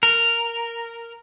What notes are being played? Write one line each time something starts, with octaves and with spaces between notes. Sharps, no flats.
A#4